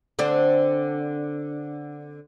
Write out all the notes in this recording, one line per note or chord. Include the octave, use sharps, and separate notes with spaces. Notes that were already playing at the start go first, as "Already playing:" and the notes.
D3 C4 D4